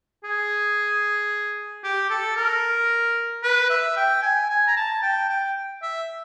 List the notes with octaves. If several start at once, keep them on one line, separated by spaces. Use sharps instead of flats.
G#4
G4
A4
A#4
B4
E5
G5
G#5
G#5
A#5
A5
G5
G5
E5